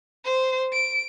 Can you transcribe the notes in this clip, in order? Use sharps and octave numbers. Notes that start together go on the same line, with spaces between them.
C5
D7